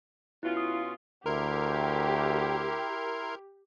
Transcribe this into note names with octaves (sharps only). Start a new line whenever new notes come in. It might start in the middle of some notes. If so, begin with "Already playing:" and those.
B2 C#4 E4 F4
D#6
D2 E4 G4 A#4 C6